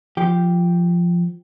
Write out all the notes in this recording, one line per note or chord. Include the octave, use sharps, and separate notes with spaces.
F3 G4